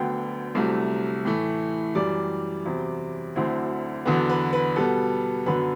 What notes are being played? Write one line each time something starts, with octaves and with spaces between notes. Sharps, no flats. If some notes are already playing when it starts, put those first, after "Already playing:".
Already playing: D2 D3 F#3 B3 G5
C2 C3 F#3 A3
A2 E3 A3
F#2 E3 G3 D5
E2 C3 F#3 C4 E4
D2 D3 F#3 C4 E4
E2 D3 F#3 B3
B4
B4
B2 G3 B3 A4
F#2 D3 F#3 B3 B4